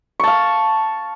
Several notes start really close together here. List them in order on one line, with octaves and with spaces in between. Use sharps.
C#6 A5 F5